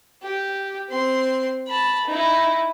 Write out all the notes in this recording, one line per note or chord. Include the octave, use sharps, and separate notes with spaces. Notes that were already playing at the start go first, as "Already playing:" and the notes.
G4
C4 C6
A5 B5
D#4 E4